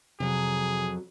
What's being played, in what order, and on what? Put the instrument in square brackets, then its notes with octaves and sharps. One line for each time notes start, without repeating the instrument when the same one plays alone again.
[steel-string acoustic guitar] F2 F#3 [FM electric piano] C3 [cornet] G#4